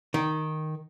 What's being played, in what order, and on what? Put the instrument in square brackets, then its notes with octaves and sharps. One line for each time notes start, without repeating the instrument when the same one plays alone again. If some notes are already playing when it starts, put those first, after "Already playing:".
[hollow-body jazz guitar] D#3